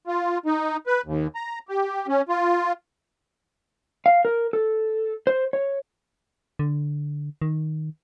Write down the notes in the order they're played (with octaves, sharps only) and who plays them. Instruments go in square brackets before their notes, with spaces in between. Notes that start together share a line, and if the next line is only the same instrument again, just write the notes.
[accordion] F4
D#4
B4
D#2
A#5
G4
C#4
F4
[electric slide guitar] F5
A#4
A4
C5
C#5
[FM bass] D3
D#3